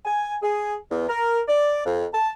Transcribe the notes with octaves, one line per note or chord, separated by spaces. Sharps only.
G#5
G#4
E2
A#4
D5
F2
A5